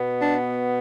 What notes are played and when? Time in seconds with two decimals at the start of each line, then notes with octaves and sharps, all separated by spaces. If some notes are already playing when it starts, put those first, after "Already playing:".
Already playing: B2 B3
0.21 D4